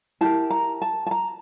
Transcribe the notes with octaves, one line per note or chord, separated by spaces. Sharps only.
E4 G4 A#4 A5
A#5
A5
A5
A#5